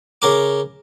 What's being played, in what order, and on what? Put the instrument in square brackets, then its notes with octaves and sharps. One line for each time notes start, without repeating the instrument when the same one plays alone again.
[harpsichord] C#3 A#4 D6